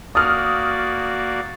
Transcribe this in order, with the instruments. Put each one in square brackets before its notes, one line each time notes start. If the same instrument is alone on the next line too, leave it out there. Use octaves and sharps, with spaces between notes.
[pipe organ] A#3 F#4 D5 [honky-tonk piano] D#6 F6